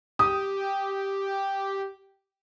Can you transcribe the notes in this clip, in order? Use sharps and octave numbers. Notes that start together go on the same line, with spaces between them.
G4 D#6